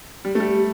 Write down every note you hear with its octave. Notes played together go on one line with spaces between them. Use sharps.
G3
A3
G3